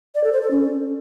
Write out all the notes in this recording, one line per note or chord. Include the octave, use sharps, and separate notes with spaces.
D5
A4
C5
A4
C#4